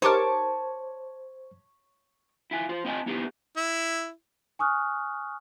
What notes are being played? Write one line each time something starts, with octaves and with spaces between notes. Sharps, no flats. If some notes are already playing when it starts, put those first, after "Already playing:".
D#4 G4 A#4 C5 C#5 A5 D6
E4 F4 G#5
F4 C5
C4 F4 D#5 F#5 G#5 A5
B3 D#4 E4 G4 G#4 B4
E4
G#5 C#6 D#6 F6 F#6